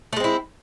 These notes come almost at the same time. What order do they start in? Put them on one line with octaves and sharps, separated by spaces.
A3 G#3 C4 E4